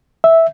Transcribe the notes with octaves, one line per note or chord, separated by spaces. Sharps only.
E5